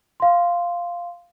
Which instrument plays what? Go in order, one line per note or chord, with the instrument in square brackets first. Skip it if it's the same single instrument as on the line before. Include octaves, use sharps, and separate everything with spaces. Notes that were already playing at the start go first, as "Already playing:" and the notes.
[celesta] F5 C6